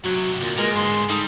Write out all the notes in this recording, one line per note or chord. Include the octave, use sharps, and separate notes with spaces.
F#2 C3 F#3
D2 A#2
A#2 G#3 A#4
G#2 D3 C6
G3 D#4 A4 E6